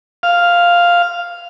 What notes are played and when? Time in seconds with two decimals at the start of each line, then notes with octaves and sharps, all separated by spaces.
0.23 F5